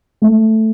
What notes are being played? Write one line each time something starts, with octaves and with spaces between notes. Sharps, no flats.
A3